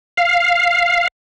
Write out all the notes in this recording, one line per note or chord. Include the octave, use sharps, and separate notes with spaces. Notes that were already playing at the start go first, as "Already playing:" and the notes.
F5